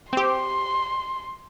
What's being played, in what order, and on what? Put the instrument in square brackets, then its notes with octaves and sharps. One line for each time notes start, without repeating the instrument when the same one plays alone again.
[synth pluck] C4 G4 [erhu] C6